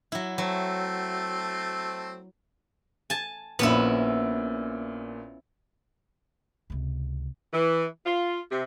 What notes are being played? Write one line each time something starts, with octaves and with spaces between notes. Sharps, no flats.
F#3 E4
F#3 A3 C4
G#5 A5
A#1 A#2 B3 C#4 E4
C#2 C3
E3
F4
C3